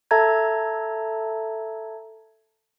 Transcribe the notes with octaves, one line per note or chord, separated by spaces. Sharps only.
A4 E5 A5 A#5 G#6